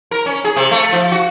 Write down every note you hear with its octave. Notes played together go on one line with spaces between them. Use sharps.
A#4
C#4
G#4
C3
A3
F3
F#4